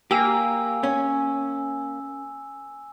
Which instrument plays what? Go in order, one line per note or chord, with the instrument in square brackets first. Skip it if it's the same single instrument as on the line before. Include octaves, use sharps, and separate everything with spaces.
[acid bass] A#3 [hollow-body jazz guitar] G4 [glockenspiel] G#5 E6
[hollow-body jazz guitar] C#4